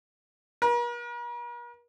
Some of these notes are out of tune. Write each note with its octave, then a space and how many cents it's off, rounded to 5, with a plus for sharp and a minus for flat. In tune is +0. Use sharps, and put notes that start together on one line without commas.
A#4 +45